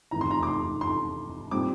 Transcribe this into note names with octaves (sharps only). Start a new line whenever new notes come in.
F1 E2 E3 A#5
C6
A#5
D6
C6
C6
A#2 G3 C4 D6